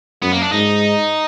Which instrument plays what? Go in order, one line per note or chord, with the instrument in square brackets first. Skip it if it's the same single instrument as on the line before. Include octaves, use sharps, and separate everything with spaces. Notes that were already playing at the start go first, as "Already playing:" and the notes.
[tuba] F#2 [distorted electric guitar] B3
[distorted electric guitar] A#3
D4
[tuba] G#2 [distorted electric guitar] D#4